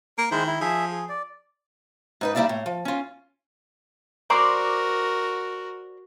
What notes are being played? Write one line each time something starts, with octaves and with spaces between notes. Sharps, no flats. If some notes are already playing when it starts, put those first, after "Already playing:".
A#3 A#4
D#3 G#3 E4 C5
E4
F3 G#4 E5
G#4
D5
G#2 D#4 B4
G3 A#3 E4 F4 D5 E5
A2
F3
C#4 F4
F#4 A#4 C5 D5 A#5 C6 D6